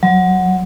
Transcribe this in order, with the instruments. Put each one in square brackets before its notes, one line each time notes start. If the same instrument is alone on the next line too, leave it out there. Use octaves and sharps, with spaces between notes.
[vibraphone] F#3